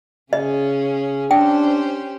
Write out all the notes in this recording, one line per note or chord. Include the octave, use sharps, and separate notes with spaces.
C#3 C#4 G#4 D#5
C#4 D4 G4 C5 G5